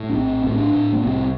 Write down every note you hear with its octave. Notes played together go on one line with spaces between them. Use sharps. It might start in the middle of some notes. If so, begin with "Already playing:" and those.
Already playing: A2
D4
A#1 C4
A2 C4
D4
A2
A#3
C2 C4